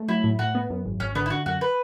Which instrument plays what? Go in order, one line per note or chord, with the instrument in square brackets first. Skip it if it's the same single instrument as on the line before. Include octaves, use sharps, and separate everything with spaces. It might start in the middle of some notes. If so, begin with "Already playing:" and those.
Already playing: [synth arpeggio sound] A3
[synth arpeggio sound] F#3 [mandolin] E4
[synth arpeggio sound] A2
[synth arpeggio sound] A2 [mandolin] F#4
[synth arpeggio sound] B3
F#2
G#1
[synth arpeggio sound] G#1 [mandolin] C#4
[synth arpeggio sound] D3 [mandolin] B3
[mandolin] E4
[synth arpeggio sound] D3 [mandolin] F#4
[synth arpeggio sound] F#2 [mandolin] F#4
[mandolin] B4